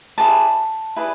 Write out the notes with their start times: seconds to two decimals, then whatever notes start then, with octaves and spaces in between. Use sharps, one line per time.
0.18 E4 G#4 B4 D5 A5
0.96 E4 G#4 B4 D5